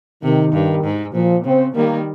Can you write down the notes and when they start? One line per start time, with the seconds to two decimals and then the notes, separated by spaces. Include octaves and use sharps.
0.23 C3 D#3
0.53 G2
0.84 G#2
1.14 A#2 F3
1.45 C#3 C4
1.75 D#3 G3 A#3